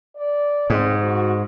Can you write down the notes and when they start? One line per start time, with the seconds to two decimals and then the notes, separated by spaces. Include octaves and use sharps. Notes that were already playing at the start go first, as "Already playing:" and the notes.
0.16 D5
0.70 G#2 C4
1.03 F#4